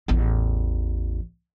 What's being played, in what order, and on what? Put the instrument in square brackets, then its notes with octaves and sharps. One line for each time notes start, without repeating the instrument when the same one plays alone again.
[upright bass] A1 E2